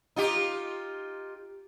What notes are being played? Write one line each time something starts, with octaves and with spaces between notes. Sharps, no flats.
D#4 F4 G4